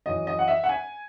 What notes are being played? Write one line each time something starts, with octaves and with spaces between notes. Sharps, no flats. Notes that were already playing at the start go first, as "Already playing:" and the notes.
F#2 E3 D#5
D#5
F#5
E5
F#5
G#5